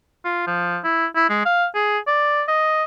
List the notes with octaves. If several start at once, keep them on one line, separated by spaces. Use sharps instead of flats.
F4
F3
E4
E4
G#3
F5
G#4
D5
D#5